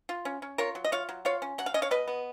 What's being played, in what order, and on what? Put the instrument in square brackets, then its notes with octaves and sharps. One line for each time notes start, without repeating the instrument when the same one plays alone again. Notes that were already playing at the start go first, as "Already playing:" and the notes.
[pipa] F4
C#4
C#4
F4 A#4 C#5
F#3
D#5
F4 C#5 F5
F#3
F4 C#5 F5
C#4
F#3 F#5
F5
C#4 D#5
C#5 F5
B2 B4 D#5
B3